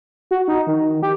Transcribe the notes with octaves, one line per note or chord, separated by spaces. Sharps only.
F#4
D#4
D#3
G4